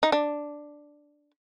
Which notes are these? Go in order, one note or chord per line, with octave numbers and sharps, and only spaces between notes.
D#4
D4